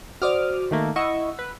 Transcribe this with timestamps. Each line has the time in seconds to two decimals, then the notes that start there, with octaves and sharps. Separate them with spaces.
0.22 F#4 C5 D5 D6 D#6 F6
0.71 D#3 A3 A#3
0.96 E4 D#5 F#5 C#6 E6
1.39 B4